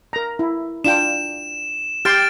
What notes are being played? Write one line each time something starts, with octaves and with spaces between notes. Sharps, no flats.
A#4 A#5
E4
D4 F4 G5 E7
G4 G5 C6 F6 A6 D7